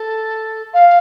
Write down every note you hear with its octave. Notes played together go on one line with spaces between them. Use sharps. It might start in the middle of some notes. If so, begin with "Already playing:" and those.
Already playing: A4
F5